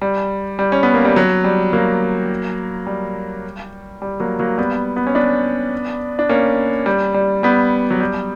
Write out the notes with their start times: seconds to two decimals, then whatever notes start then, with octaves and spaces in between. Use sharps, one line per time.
0.02 G3
0.59 G3
0.72 C#4
0.83 B3
0.94 A#3
1.05 G3
1.16 F#3
1.44 G3
1.73 F#3 A#3
2.87 G3
4.02 G3
4.20 F#3 A#3
4.39 F#3 A#3
4.58 G3 B3
4.96 B3
5.07 C#4
5.15 B3 D4
6.19 D4
6.29 A#3 C#4
6.86 G3
7.14 G3
7.43 G3 B3
7.90 F#3
8.00 G3